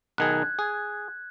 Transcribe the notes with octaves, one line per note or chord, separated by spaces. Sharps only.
B1 D#3 G#4 F#6 G#6
G#4